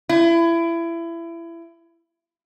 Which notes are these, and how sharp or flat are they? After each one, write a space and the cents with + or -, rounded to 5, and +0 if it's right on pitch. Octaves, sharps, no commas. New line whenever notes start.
E4 +25